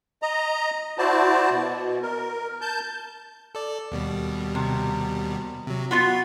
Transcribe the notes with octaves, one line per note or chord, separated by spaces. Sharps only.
D#5 A#5
E4 F#4 C5 D5 A5
B2
A#4
A5 G6
A4 D5
D#2 B2 G3
C3
C3 F#3
B3 F4 F#4 B5 C6